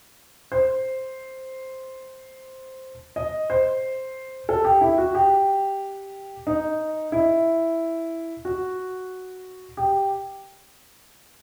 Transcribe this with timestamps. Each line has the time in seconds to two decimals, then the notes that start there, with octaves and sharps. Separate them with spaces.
0.52 C5
3.16 D#5
3.50 C5
4.49 A4
4.65 G4
4.81 E4
4.98 F#4
5.15 G4
6.47 D#4
7.12 E4
8.45 F#4
9.77 G4